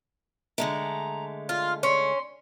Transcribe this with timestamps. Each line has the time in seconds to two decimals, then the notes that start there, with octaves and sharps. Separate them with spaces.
0.58 D3 G#3 A3 A#5
1.49 F4 F6
1.83 C#4 C6